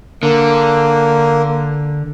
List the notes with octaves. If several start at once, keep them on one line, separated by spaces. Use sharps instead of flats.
D3 A#3